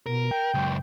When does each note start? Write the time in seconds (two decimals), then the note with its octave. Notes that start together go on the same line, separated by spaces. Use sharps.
0.06 B2 A#4
0.31 G5
0.54 C#2 F#2